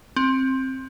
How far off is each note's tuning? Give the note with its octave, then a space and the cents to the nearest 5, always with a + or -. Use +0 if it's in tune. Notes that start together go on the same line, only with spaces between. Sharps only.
C4 +15